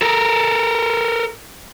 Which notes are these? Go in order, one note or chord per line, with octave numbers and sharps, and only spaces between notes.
A4 A#4